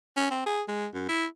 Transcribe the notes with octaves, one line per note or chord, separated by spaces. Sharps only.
C#4
C4
G#4
G#3
F#2
E4